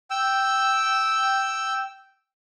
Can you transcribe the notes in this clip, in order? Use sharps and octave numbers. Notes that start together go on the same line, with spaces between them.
G5 E6